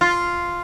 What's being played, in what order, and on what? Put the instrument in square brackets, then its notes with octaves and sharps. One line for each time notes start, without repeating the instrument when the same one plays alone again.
[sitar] F4